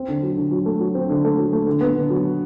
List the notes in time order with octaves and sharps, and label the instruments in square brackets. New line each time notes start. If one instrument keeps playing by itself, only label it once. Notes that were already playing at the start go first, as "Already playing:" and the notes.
Already playing: [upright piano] C4
D3
F#3
D3
F#3
A3
F#3
C4
D3
A3
F#3
A3
D3
B3
D3
F#3